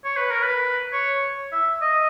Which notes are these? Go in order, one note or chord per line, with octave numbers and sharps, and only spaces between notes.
C#5
B4
A#4
B4
C#5
E5
D#5